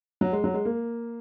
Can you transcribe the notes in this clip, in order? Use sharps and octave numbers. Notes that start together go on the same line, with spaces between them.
F#3
G#3
F#3
G#3
A#3